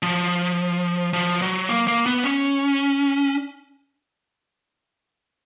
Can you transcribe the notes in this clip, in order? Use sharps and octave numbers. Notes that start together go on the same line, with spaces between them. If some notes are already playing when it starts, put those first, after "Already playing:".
F3
F3
F#3
A#3
A#3
B3
C#4